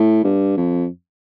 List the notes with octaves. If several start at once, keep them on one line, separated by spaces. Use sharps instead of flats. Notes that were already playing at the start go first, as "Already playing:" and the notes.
Already playing: A2
G2
F2